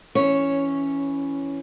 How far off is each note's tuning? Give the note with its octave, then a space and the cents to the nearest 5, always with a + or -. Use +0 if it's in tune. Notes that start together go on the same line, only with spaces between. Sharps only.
E3 +0 C#4 +0 C#5 +0